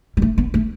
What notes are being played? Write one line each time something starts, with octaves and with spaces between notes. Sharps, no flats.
G3
A3
B3
A3